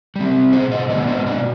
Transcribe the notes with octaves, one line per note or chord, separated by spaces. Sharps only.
G3 C4
B2 G#4 C5
C5 D#5
G#3 B3 D4 B4 D5
C5 D#5
B2 B4 D5